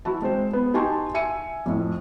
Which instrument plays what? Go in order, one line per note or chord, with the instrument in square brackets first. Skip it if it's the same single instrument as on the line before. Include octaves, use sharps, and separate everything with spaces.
[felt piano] E3 E4 F#4 A5
G#3 C4 C5
B3
D#4 G4 G#5 A5 C6 C#6
E5 G#5 C#7 D#7
F2 A2